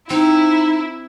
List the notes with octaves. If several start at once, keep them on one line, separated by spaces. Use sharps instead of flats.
C4 D#4 E4